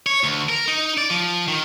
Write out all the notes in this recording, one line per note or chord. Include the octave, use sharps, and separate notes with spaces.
C#5
D2
A#4
D#4
D5
F3
D#3